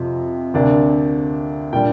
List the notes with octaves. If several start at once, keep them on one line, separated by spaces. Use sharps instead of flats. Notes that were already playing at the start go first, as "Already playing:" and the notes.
Already playing: F2 C3 F3
D2 C3 A#3 D4
A#2 G3 D4 G5